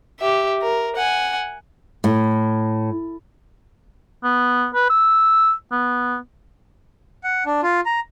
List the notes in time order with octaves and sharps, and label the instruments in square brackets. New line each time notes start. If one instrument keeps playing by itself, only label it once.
[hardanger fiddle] G4 E5
A#4
F#5 G#5
[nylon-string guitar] A2
[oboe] B3
B4
E6
B3
[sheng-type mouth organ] F#5
D4
F4
A#5